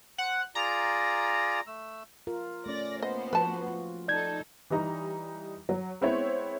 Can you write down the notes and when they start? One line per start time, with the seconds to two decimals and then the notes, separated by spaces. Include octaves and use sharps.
0.18 C5 F#5
0.55 F4 G#4 D5 A#5
1.67 A3 E6
2.27 F4 A#4
2.66 A3 C#4 D5 A#6
3.03 A#3 B3 C5 D#5
3.33 F3 F#4 B4 A5
3.68 F4
4.08 D#4 A4 D5 G6 G#6
4.70 E3 G3 D#4 A#5
5.69 F#3
6.01 G#3 B3 C4 E4 C5 C#5